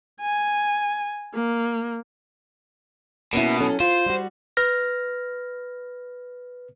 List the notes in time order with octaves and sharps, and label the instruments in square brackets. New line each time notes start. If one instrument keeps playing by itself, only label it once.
[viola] G#5
A#3
[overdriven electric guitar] B2 [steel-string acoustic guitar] A#3 C#4 E4
[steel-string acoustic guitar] F#3 C#4 A4
[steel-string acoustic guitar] F4 [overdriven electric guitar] C5
[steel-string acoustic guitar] G3 F#4
[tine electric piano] B4 F6 A#6